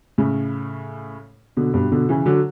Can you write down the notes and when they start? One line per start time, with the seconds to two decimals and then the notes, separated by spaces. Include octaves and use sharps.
0.18 A2 C#3
1.57 B2 D3
1.74 G2 B2
1.91 B2 D3
2.09 C#3 E3
2.26 D3 F#3